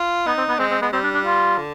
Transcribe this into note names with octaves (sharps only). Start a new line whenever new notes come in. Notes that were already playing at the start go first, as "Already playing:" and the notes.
Already playing: F4
B3 D#4
C4
B3
G#3 C4
C4
G#3 B3
G3 C4
D4
D4
F4
D3